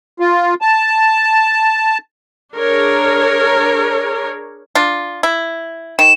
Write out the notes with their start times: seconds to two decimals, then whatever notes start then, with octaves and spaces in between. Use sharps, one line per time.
0.20 F4
0.62 A5
2.56 D4 G#4 A#4 C#5
4.75 D4 F4
5.23 E4
5.99 D#3 E7